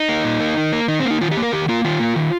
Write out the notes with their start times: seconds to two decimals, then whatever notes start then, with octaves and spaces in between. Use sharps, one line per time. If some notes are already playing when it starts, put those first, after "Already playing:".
Already playing: D#4
0.09 A#3
0.24 A#2
0.40 A#3
0.57 D#3
0.73 A#3
0.88 D#3 D#4
1.00 C4
1.05 A#3
1.10 D#4
1.21 D#3 F4
1.31 G4
1.37 A#3
1.42 A#4
1.52 D#3 G4
1.69 A#3 F4
1.84 D#3 F4
2.00 A#3
2.16 D#3